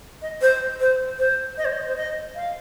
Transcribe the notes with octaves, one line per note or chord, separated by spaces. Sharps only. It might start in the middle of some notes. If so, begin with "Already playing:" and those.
D#5
C5
C5
C5
D#5
C5
D#5
C5
D#5
F5